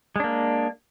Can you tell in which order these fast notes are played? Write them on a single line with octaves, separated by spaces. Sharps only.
G#3 D4 A#3